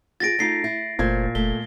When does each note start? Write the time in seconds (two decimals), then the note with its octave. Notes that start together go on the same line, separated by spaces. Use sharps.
0.20 F4 G4 G#4 A6 A#6 D7
0.39 A3 D#4 F4 B6 C7
0.64 E4
0.99 F#1 A#2 A3 C5 G#6
1.35 F1 A3 G7